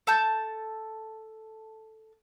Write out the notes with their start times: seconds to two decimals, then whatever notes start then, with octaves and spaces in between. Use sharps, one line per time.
0.07 A4 A5 G6